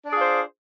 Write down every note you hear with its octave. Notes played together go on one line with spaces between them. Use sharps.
D4 F4 G#4 C5 D5